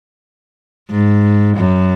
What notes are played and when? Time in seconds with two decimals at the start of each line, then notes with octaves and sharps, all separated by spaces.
0.90 G#2
1.57 F#2